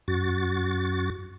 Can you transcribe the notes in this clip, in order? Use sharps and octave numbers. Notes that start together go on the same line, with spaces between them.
F#2 F#4 A6